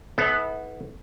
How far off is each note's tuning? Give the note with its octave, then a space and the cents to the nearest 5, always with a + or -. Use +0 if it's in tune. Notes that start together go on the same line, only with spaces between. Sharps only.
B3 +0 E4 -40 A4 -35